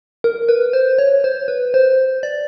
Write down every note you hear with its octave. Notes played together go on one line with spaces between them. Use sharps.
A#4
B4
C5
C#5
C5
B4
C5
D5